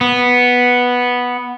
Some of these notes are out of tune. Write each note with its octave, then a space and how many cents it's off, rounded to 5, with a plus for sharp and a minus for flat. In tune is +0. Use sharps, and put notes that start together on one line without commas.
B3 -5